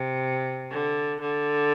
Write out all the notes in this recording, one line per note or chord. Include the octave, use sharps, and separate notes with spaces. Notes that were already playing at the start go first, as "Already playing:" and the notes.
Already playing: C3
D3
D3